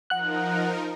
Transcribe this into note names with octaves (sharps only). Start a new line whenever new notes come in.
F3 D#4 A#4 F#5 F#6